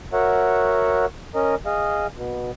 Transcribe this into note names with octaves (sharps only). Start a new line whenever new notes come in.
F#4 A#4 C#5 E5 F#5
C#4 A#4 D#5
G#4 D#5 F5
B2